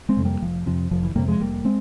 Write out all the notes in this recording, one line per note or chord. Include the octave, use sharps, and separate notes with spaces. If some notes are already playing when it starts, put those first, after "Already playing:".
G#3 C4
F2 C3
G3 A#3
F1 F3
F2 C3 F3
F1 F3
E3
F2 C3 G3 A#3
F3 G#3
F1 G3 A#3
G#3 C4